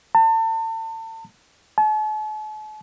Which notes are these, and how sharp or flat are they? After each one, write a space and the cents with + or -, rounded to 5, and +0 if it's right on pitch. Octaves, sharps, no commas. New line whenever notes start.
A5 +35
A5 -45